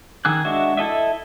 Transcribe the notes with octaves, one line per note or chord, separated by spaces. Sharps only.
D#3 G#4 E6 F#6
G#3 D4 F#4 E5
E4 A4 D#5 E5